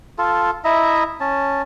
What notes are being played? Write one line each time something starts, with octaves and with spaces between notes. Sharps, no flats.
F4 A4
E4 D#5 E5 A#5
C#4 A5